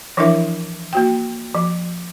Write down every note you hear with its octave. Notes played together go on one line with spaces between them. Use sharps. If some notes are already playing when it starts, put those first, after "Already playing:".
E3 F3 D4 E4 A#4 E5
A#3 F#4 G5
F3